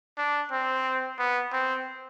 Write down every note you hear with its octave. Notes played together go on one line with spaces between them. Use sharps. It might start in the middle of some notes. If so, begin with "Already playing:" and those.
D4
C4
B3
C4